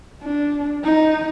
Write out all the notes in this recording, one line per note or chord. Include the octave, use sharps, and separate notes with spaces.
D4
D#4